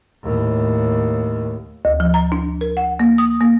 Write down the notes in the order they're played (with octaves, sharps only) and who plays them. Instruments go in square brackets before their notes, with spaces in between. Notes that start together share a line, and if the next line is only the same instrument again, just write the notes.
[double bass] D#2 A2
[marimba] D2
F3
A#5
D4
A#4
F#5
A#3
D#6
A#3